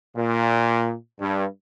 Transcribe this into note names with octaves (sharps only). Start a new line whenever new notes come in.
A#2
G2